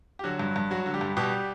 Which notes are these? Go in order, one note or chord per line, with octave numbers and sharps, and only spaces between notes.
G4
D3 F#3 F#4
G2
G2
F#3 F#4
D3
G3 G4
G2
B2 G3 G4